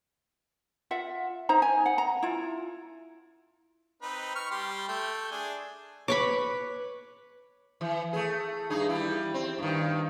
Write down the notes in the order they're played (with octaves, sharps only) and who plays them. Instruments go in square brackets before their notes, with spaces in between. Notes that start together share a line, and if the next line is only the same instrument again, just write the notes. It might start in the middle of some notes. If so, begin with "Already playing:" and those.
[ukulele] F4 E5 F#5
D#4 C5 A#5
G#5
F#5
A#5
E4 F4
[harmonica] C4 D#4 B4
C#6 F6
G3 G4 C6
A3 G5
D4 G#4
[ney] B4 [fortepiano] C#5 [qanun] B5 C#6 D6
[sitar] E3
A3 G#4
G2 D#4 G#4
E3 G3 E4
C4
G2 D#3